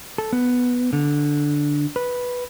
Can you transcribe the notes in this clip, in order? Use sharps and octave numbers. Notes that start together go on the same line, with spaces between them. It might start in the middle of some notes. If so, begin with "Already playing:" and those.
A4
B3
D3
B4